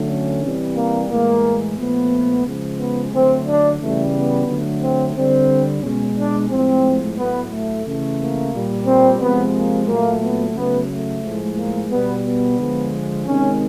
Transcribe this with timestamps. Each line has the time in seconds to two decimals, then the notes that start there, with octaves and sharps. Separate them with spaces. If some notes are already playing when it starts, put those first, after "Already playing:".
Already playing: D3 F#3 A3
0.08 C#4
0.42 C3 E3 G3
0.75 A#3
1.09 A2 E3 G#3 A#3
1.77 A#2 F3 A3 B3
2.45 C#3 F3 G#3
2.78 B3
3.12 D3 F#3 A3 C4
3.46 D4
3.79 C#3 E3 G3 A3
4.13 B3
4.47 D3 F#3 A3
4.81 C4
5.15 D3 G3 C4
5.82 B2 G#3 C#4
6.17 D4
6.51 A2 F3 G#3 C4
7.17 A2 F#3 A3 B3
7.51 A3
7.85 C#3 E3 A3
8.18 A#3
8.53 A#2 G3
8.86 C4
9.20 C3 F3 G#3 B3
9.55 A#3
9.87 A#2 F#3 A3 A#3
10.22 B3
10.55 C#3 F#3 A3 B3
10.90 A3
11.23 A2 F3 G#3
11.57 A#3
11.90 B2 G3 B3
12.25 B3
12.58 D3 F3 G#3
13.26 C3 D#3 G#3 C#4